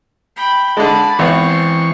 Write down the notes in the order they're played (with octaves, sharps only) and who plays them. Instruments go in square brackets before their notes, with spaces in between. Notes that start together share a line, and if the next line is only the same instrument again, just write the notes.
[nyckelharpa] G5 B5
[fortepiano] D3 G#3 [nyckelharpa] D5 B5 [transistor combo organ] A5
[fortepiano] G#1 B3 [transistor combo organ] E3 C#6 [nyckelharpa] C4